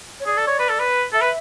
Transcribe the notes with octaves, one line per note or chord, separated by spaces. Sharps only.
C#5
G#4 D5
A4
C#5
B4
A4
B4
A4 E5
B4